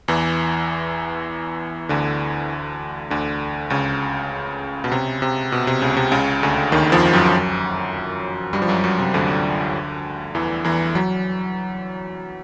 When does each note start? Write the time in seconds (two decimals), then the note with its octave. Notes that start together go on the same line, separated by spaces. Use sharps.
0.08 E2 E3
1.89 D2 D3
3.10 D2 D3
3.70 C#2 C#3
4.84 B2
4.92 C3
5.22 C3
5.52 B2
5.67 C3
5.81 C#2 C#3
5.97 C3
6.12 C#2 C#3
6.43 D2 D3
6.72 D#2 D#3
6.92 F2 F3
7.13 F#2 F#3
8.53 G2 G3
8.62 F3
8.68 F#2 F#3
8.84 F#2 F#3
8.99 C3
9.14 D2 D3
10.35 E2 E3
10.64 E2 E3
10.95 F#3